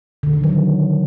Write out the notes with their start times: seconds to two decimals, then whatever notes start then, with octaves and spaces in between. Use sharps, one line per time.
0.23 D3
0.33 D#3
0.43 F#3